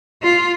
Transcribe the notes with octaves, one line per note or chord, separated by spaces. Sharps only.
F4